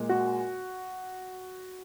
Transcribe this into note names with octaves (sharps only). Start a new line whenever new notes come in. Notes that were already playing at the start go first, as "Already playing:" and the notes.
Already playing: A#2 G#3
F#4